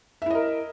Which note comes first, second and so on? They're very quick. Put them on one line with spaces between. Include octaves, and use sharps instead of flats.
E5 E4 D#5 A#4